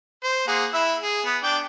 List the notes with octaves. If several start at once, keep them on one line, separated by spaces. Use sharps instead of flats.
C5
A#3 G#4 F#5
E4 E5
G#4
B3
D4 G5 D6